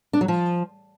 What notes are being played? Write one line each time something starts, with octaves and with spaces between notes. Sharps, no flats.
D4
F#3
F3